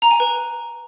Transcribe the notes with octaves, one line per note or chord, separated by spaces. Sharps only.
A#5
G#5
B4